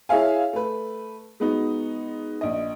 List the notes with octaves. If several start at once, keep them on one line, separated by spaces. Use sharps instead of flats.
E4 G#4 C#5 E5 F5 G#5
A3 B4
G#3 B3 D#4 F#4
A#1 D#5